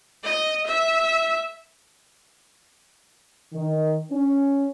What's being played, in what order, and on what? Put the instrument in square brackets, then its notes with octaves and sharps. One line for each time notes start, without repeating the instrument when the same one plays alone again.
[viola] D#5
E5
[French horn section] D#3
C#4